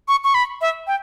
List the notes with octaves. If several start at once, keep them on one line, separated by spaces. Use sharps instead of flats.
C#6
C#6
B5
E5
G5